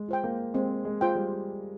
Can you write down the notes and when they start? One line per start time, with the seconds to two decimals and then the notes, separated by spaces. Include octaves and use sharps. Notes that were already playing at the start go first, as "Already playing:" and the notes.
Already playing: G#3
0.09 F4 C5 G5
0.24 A#3
0.54 G#3 C4
0.85 G#3
1.01 F4 C5 G5
1.15 G3